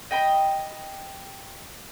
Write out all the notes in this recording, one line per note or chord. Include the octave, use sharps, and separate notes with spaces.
D#5 G5 B5